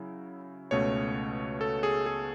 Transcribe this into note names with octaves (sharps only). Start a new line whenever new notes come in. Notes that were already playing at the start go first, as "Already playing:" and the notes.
Already playing: C#3 F#3 E4
C#2 B2 A3 C#4 C#5
A4
G#4
G#4